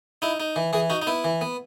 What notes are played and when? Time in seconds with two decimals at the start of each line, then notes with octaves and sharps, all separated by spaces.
0.22 D#4 E4
0.40 D#4
0.56 E3
0.73 E3 G#4
0.90 D#4 F#4
1.02 D#4
1.07 B3 E4
1.24 E3
1.41 B3